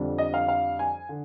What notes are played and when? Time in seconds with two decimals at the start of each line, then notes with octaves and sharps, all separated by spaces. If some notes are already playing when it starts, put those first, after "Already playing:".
Already playing: F2 D3 G3 D4
0.18 D#5
0.34 F5
0.48 F5
0.79 G#5
1.09 D3